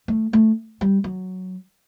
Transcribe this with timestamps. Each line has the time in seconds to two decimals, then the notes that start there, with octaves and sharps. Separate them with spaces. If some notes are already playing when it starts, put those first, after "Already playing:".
0.08 A3
0.33 A3
0.81 G3
1.04 F#3